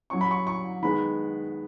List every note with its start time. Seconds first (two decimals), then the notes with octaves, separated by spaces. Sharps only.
0.10 F#3 C#4 C#6
0.21 B5
0.31 C#6
0.47 C#6
0.83 D#3 G#3 B3 B5